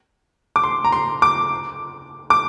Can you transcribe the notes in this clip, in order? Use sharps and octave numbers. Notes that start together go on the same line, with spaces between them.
D6
C6
A#5
C6
D6
D6